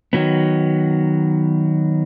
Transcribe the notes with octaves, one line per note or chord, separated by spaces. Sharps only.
D#3 F#3 B3